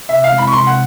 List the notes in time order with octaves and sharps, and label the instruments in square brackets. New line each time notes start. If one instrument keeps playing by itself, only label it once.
[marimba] C3 [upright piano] E5
[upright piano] F5
[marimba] E3 G#3 C4 E4
[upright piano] B5
C#6
[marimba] C3 [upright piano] C6
[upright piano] F#5